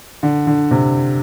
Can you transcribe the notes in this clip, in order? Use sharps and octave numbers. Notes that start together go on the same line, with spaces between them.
D3
D3
C3